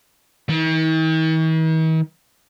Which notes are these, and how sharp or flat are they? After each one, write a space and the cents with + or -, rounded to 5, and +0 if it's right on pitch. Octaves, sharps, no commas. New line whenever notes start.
D#3 +45